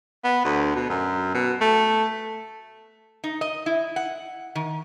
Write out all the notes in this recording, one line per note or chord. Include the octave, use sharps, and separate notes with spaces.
B3
D2
B2
F#2
B2
A3
D#4
D#5
E4
F#5
D#3